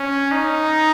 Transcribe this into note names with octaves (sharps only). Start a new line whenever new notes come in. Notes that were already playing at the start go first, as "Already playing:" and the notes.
Already playing: C#4
D#4